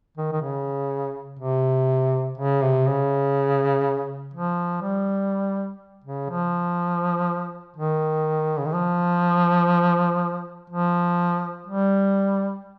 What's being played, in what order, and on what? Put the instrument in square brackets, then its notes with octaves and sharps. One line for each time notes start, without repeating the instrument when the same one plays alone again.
[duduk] D#3
D#3
C#3
C3
C#3
C3
C#3
F3
G3
C#3
F3
D#3
C#3
D#3
F3
F3
G3